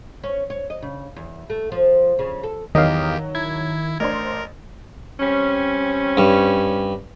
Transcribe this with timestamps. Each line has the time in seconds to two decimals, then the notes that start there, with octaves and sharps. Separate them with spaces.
0.24 C#4
0.50 C#5
0.70 D#5
0.82 C#3
1.16 E2
1.50 A3
1.72 F3
2.19 C#3
2.43 A4
2.75 E2 D#3 F#3 G4 D#5 F5
3.35 E4 G#6
4.00 A1 D4 A#4 C5
5.20 G3 C4 C#4
6.17 G2